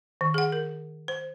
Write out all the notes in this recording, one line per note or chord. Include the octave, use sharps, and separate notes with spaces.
D#3
G#4 F#5
A#4
C5